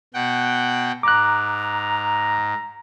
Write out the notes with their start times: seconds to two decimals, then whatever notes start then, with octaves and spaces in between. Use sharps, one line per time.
0.14 B2 F#5 G5
1.03 G#2 A#5 D6 F#6